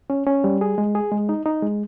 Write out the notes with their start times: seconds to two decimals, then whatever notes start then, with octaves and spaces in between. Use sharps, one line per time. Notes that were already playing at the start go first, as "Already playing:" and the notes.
0.10 C#4
0.27 C#4
0.44 G3
0.61 G#4
0.78 G#3
0.95 G#4
1.12 G#3
1.29 D#4
1.46 D#4
1.62 G#3